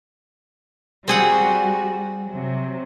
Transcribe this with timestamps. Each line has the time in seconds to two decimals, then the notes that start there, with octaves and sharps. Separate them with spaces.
1.08 G3 C4 F#4 G#4 F#5
2.25 C3 F#3